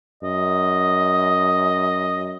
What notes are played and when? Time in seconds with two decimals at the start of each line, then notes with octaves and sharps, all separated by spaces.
0.23 F#2 D#5